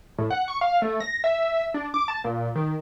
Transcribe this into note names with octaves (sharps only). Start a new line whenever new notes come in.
A2
F#5
C#6
F5
A3
A#6
E5
D4
D6
A5
A#2
D#3